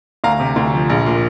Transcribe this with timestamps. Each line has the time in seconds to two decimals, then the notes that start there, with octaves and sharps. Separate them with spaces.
0.24 D2 F5 A#5
0.40 C3
0.56 D2
0.74 F3
0.90 A#1
1.06 A#2